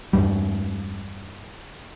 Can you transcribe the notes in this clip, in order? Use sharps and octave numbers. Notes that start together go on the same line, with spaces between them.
E2 G2 G3